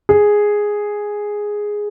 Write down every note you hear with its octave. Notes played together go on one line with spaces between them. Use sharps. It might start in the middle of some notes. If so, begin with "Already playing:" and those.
G#4